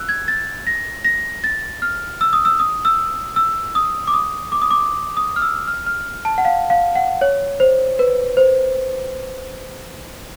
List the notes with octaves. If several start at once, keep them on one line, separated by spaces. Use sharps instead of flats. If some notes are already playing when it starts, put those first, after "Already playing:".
Already playing: E6 F#6
G#6
A6
A#6
A#6
A6
F6
E6
D#6
E6
D#6
E6
E6
D#6
D6
D#6
D6
D#6
D6
D#6
F6
E6
F6
F6
A5
F#5
F5
F5
F#5
C#5
C5
B4
C5